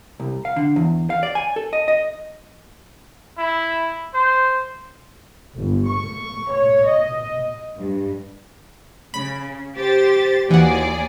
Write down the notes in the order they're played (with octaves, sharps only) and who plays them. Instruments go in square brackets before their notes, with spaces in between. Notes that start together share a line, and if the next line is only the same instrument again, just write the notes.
[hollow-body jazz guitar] C2
F5
D3
E2
F5
D5
G#5
A4
D#5
D#5
[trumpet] E4
C5
[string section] G1
C#6
C#5
D#5
G2
[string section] C#3 [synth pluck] B5
[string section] G4 C5 A6
[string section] D#2 G#4 D5 [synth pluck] E3 F#4